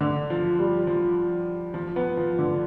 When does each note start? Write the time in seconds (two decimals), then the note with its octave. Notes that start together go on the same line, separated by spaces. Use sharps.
0.01 D3
0.30 F3
0.59 G3
0.87 F3
1.74 F3
1.96 B3
2.17 F3
2.39 D3